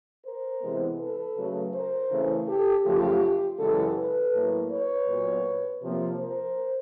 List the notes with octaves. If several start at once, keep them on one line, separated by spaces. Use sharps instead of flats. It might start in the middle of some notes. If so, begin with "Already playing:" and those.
A#4 C5
C3 E3 G#3 B3
A4 B4
C#3 F#3 A3
A#4 C5
C#3 E3 A3
G4 A4
F#2 C#3 F3 A3 F4 G4
F#2 C#3 E3 G#3 G4 A4
A4 B4
A2 F#3 A#3
B4 C#5
A#2 F#3 B3
C3 F3 A#3
A#4 C5